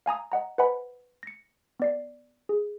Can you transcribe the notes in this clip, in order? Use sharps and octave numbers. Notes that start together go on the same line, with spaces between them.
F5 G#5 A#5 D#6
D#5 F#5 A#5
B4 C5 D#5 F#5 G#5 B5
A#6 C#7
B3 D5 C7
G#4